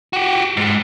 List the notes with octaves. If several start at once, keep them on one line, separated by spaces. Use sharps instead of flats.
F#4 G4
G#2 G#3